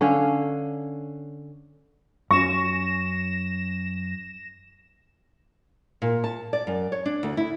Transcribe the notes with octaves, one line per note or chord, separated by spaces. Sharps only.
D3 C#4 C#5 F5
F#2 C#4 C#6 A#6 E7
A#2
A5
D5
F#2
C#5
D4
D2
E4